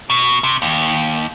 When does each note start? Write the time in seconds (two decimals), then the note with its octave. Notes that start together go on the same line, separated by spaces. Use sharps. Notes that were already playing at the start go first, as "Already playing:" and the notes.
0.10 B2
0.44 C3
0.62 D#2